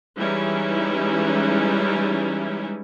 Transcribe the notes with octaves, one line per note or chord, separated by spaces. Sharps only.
E3 G3 G#3 C#4 D#4 E4